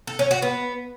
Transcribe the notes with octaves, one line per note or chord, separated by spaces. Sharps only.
A4
C#4
F#4
B3